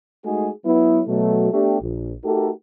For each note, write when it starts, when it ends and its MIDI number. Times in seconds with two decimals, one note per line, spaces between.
0.25 0.50 56
0.25 0.50 57
0.25 0.50 63
0.25 0.50 66
0.25 0.50 68
0.65 1.01 54
0.65 1.01 59
0.65 1.01 64
1.07 1.51 47
1.07 1.51 54
1.07 1.51 57
1.52 1.78 57
1.52 1.78 59
1.52 1.78 62
1.52 1.78 67
1.82 2.13 34
2.24 2.50 57
2.24 2.50 63
2.24 2.50 66
2.24 2.50 67
2.24 2.50 69
2.24 2.50 70